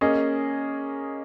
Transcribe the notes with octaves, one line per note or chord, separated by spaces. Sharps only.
A#3 C#4 G#4 D#5